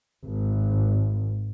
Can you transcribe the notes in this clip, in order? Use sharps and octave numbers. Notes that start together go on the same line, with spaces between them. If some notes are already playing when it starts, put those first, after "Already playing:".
G#1